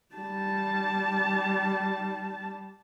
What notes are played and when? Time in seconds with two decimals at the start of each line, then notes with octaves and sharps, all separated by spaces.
0.15 G3 A5